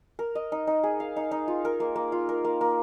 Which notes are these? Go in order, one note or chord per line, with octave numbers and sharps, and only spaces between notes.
A#4
D#5
D#4
D#4
G#4
F5
D#4
D#4
F4
A#4
A#3
A#3
F4
A#4
A#3
A#3